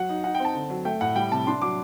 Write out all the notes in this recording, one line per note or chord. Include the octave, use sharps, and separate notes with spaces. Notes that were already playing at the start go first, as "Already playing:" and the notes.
Already playing: F#3 F#5
D#4
D#4 F#5
G5
C4
A5
D3
F#3
A3 G5
A2 F#5
G3 G5
C3 A5
D4 C6
F#3 D6